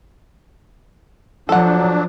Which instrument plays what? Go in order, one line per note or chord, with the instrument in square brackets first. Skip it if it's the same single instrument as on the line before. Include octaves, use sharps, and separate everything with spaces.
[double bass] F3 [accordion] F#3 D4 [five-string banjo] A4 F#5